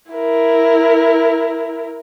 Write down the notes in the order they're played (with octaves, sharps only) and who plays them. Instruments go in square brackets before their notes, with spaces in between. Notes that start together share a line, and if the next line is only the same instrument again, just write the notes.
[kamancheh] E4 A#4